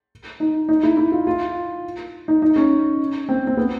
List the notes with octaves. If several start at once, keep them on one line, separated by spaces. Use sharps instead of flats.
D#4
D#4
E4
E4
F4
F4
D#4
D#4
C#4
C4
C4
B3